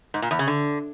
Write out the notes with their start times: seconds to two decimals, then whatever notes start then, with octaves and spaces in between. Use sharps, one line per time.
0.14 G#2
0.22 A#2
0.31 E2
0.39 C#3
0.47 D3